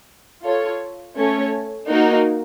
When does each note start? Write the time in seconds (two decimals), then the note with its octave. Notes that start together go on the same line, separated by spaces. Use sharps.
0.43 F4 A4 C#5
1.16 A3 C#4 A4 C#5
1.88 A#3 D#4 F#4 A#4